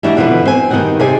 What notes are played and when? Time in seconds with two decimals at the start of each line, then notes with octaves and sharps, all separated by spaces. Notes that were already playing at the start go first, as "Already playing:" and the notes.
0.03 E3 G3 D4 D#4 F#4
0.16 F2 B2 D3 E3 D4 B4
0.45 C4 G#5
0.70 G2 D#3 F3 D#4 F#4 F#5
1.00 C3 C4 D#4 G#4 D5 G#5